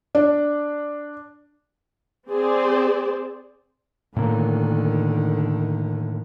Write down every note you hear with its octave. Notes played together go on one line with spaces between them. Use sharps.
D4
C4 G#4 C5 D5
A2 D3 D#3 A#3